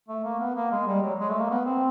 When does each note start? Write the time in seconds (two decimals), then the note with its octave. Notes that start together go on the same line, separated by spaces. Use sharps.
0.09 A3
0.24 A#3
0.40 B3
0.55 A#3
0.71 G#3
0.87 G3
1.03 F#3
1.19 G#3
1.29 A3
1.40 A#3
1.50 B3
1.66 C4